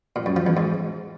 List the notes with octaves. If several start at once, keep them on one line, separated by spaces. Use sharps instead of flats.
A#2
F#2
F3
E2
G#2